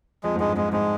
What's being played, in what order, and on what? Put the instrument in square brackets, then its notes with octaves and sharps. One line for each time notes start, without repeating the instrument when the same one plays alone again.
[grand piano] F2 [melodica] G#3
[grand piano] G#2
[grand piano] G2 [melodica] G#3
[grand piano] G#2 [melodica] G#3
[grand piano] G#2 [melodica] G#3